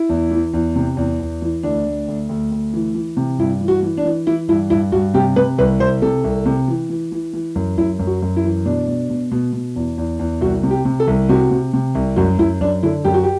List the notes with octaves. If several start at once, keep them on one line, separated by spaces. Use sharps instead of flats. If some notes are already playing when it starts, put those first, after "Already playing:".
Already playing: E4
E2
E3
E2
C3
E2
E2
E3
D2 D4
D2
D2
D2
D2
E3
E3
C3
G2 E4
E3
F#4
E3
D4
E3
E3 E4
G2 E4
G2 E4
G2 F#4
C3 G4
C3 B4
C2 B4
C2 C5
C3 A4
C2
C3
E3
E3
E3
E3
F#2
F#2 E4
F#2
F#4
F#2
E4
E3
B2 D4
B2
B2
B2
B2
E2
E2
E2
C2 F#4
C3
G4
C3
A4
C2
C3 F#4
C3
C3
C2
F#2 F#4
F#2 E4
F#2 D4
D3 E4
F#2 G4
F#4
G4